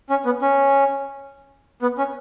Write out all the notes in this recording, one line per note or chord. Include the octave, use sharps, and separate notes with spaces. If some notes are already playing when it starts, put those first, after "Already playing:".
C#4
B3
C#4
B3
C#4